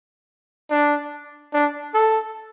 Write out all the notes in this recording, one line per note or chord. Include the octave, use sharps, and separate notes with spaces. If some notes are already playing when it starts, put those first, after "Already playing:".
D4
D4
A4